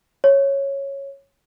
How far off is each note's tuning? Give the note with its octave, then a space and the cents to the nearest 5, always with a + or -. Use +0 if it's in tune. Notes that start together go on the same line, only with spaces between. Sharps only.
C#5 -5